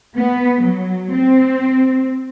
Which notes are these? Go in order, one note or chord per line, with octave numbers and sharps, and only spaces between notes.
B3
F#3
C4